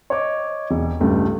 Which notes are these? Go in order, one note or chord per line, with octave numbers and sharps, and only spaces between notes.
C#5 D#5 D6
E1
C#2 G2 G3 A3